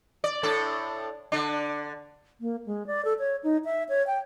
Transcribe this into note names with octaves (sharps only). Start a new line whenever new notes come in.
D5
A2 D4 A4
D3 D4
A#3
G#3
D5
A4
C#5
D#4
E5
C#5
G5